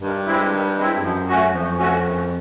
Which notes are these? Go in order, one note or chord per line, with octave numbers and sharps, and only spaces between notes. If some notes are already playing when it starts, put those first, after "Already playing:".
G2 D#3
G#3 C4 E4
D#3
G#3 C4 E4
F#2 F3
A3 C#4 F#4
F2 F3
A3 C#4 F#4
F#2